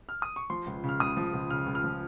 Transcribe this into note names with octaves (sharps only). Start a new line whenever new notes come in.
F6
D#6
C#6
F3 C6
C#2
C#3
F6
C#2 D#6
F3
C#2
C#3 F6
C#2
F6
F3